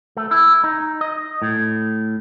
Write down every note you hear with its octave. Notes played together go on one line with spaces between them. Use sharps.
A3
E4
D#4
D#5
A2